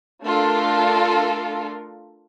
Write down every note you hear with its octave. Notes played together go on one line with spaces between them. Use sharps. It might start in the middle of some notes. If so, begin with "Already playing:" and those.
A3 D4 F4 A4 A#4